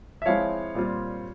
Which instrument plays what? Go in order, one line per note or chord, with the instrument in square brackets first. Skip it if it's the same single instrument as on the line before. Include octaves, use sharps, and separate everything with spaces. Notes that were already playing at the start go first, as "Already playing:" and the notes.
[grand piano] E5
F3 G#3 C4 E4 C#5 F5
A#2 G3 C4 F4